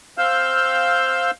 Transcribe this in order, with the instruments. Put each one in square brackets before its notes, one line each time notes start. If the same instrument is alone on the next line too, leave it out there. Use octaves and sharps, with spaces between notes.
[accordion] C4 F5 E6 F6 G6